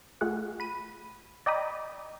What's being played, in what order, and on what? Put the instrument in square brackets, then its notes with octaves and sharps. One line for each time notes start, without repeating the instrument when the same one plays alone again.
[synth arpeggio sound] A3 F4 G#4 F#5
B5 D#7
D5 D#5 G5 A#5 B5 D#6